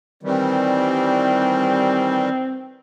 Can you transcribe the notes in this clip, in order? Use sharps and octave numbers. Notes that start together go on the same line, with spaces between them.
D#3 E3 G3 C4